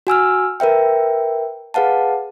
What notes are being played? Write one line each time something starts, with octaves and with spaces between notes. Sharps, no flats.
F#4 G#5 E6 F6
A#4 B4 E5 G5
G#4 B4 F5 F#5 A5